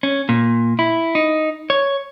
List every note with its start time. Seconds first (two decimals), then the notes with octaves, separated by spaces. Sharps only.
0.03 C#4
0.29 A#2
0.79 E4
1.15 D#4
1.70 C#5